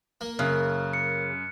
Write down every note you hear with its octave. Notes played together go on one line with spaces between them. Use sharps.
A#3
F#2 C#3 F6 F#6
C#7